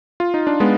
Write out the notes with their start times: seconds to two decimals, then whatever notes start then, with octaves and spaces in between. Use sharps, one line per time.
0.20 F4
0.34 D#4
0.47 D4
0.60 G#3 B3